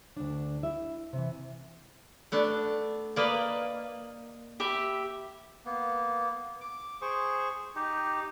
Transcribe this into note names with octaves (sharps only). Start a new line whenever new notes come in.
D2 D4
E4 E5
C3 E3
A3 B3 D4
A#3 B4 D5 D#5 F5
G4 E5 B5
A#3 B3
D6
G#4 C5 C#6
D#4 G4